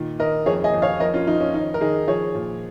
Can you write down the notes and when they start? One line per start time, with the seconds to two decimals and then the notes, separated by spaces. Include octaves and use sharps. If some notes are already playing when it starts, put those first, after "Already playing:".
Already playing: A#2 D#3
0.19 D#3 A#4 D#5
0.46 F2 G#4 C#5
0.64 D#5 G#5
0.74 F2
0.82 C#5 F5
1.00 F3 A#4 D#5
1.14 C#4 F4
1.27 F3 D#4
1.40 C#4
1.54 D#3 D#4
1.74 A#4
1.81 D#3 D#4 G#4
2.08 F3 G#4 C#5
2.35 A#2